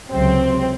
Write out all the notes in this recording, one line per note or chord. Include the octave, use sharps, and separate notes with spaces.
C#2 C3 F#3 C4